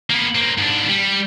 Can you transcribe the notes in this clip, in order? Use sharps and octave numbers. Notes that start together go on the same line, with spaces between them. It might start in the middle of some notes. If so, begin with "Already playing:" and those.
A#3 B3
A#3 C4
G#2 D4
G3